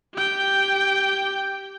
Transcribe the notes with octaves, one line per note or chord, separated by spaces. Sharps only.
G4 G5